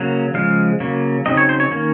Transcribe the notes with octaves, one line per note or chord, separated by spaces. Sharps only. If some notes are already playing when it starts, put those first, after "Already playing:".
Already playing: C#3 F#3 A#3
C#3 F3 G#3 F5
C#3 F#3 A#3
C#3 F#3 C4 D#4 D#5
C#5
C5
C#5
D#3 A#3 C#4